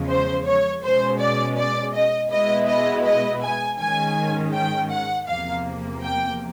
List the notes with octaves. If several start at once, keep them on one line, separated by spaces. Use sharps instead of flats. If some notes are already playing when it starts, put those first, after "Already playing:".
Already playing: E2 C#3 F3 G#3
C5
C#5
B2 G#3 C#4 C5
D5
D5
D#5
B2 G#3 B3 E4 D#5
D#5
D#5
G#5
G#2 D#3 G#3 C#4 G#5
G5
F#5
E2 C3 F3 A#3 F5
G5